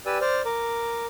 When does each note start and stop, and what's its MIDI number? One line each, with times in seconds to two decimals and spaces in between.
0.06 0.18 67
0.06 0.18 71
0.06 0.18 74
0.06 0.18 80
0.06 0.18 88
0.21 0.41 72
0.21 0.41 74
0.21 0.41 89
0.45 1.06 70
0.45 1.06 86